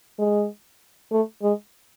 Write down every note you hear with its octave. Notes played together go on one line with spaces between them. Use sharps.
G#3
A3
G#3